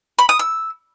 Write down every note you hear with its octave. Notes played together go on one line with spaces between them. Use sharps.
B5
D#6
E6